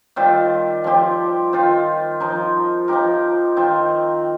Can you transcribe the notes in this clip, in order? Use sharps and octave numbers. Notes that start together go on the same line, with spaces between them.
D#3 G3 C4 F4
F3 C4 G4
D#3 C4 F4
F3 D#4 A#4
F3 D#4 G4 A#4
D#3 C4 F4